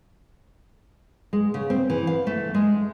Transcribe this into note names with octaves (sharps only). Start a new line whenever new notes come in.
G#3
C#3
C4
E3
F5
A3
G#3